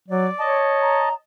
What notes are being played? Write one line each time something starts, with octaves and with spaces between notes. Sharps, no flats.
F#3 D5
C#5 D#5 A5
A#5